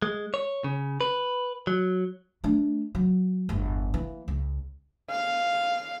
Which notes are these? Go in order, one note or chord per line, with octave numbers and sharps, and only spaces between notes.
G#3
C#5
C#3
B4
F#3
A3 D4
F#3
G1 E2
E3 A#3
C#2
F5